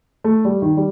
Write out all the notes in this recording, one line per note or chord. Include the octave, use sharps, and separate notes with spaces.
A3
G3
D#3
G3